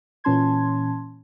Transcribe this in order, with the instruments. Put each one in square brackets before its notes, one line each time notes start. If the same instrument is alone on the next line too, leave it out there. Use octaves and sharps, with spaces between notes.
[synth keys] A#2 E3 C#4 A5 C6 G#6